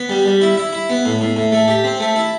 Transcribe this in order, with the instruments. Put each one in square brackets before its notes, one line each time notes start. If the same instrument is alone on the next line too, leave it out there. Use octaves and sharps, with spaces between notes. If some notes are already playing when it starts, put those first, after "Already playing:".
Already playing: [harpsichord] B3
G3
G3
E4
E4
E4
B3
A2
A2
A2
A3
G4
C4
A3
E4